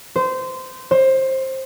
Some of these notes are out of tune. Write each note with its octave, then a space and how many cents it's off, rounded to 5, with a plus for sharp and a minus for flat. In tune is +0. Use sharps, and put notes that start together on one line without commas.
C5 -20
C5 +20